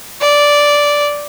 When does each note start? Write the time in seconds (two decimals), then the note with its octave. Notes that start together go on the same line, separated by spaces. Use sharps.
0.21 D5